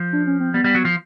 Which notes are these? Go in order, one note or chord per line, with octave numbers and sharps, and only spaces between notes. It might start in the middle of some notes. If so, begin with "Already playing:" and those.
Already playing: F3
D4
C#4
C4
G3 B3
G3
F#3
F3